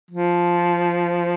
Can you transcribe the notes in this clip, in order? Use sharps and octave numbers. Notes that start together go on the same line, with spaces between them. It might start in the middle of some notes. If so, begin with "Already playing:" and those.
F3